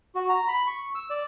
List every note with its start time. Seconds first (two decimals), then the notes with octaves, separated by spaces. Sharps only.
0.15 F#4
0.29 A#5
0.48 B5
0.67 C#6
0.95 E6
1.10 D5